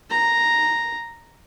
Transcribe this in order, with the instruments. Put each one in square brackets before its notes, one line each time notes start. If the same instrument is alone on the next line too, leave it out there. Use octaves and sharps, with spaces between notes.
[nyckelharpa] A#5